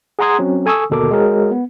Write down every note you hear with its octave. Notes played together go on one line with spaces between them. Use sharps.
G#4 F#5 A#5 C6 D#6 G#6
F#3 C4 C#4
A4 G#5 C#6 D#6 E6
G1 D#2 B2 A4 A#4 D6
G#3 F#4 G#4 A#4 C#5
B3